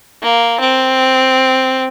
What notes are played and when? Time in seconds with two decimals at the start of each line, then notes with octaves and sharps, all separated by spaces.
0.23 A#3
0.60 C4